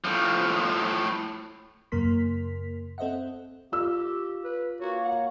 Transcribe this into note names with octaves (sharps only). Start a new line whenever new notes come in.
A2 F3
F#2 C#3 A#3 A#4 C6 B6
C4 A4 C5 D#5 E5 F#5
F4 G4 E6
B4
A#3 F#4 C#5
F#5